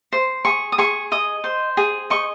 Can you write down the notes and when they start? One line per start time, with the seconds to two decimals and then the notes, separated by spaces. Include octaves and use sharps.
0.13 C5
0.45 G#4 C#6
0.72 D#6
0.78 G#4 C#6
1.12 D#5 D#6
1.44 C5
1.77 G#4
2.10 D#5 C#6